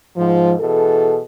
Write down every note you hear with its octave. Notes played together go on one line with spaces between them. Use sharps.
G#2 F3
B2 E3 G#4 A4